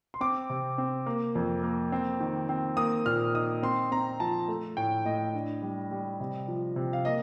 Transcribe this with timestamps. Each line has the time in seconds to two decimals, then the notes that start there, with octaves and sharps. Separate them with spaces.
0.14 C6
0.21 C4 D6
0.50 C3
0.78 C4
1.06 A#3
1.35 F2
1.63 A#3
1.92 C4
2.20 D#3
2.49 C4
2.77 A#3 D#6
3.06 A#2 F6
3.34 D#4 D#6
3.63 C4 C6
3.92 C4 A#5
4.20 F3 A5
4.48 A3
4.77 A2 G5
5.05 A2 D#5
5.34 D4
5.62 G3
5.91 G3
6.20 C3
6.48 F3
6.76 C3
6.93 F5
7.05 A#3 D#5